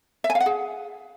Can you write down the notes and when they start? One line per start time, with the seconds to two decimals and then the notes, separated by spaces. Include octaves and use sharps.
0.24 E5
0.30 G#5
0.35 F5
0.40 F#5
0.46 G#4